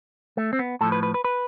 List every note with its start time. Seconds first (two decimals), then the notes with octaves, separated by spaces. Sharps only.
0.37 A3
0.53 C4
0.59 B3
0.81 A2 F3 A4
0.92 B4
1.03 B4
1.14 B4
1.24 B4